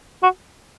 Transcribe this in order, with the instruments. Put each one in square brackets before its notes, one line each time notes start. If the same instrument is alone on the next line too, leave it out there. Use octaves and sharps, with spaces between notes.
[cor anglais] F#4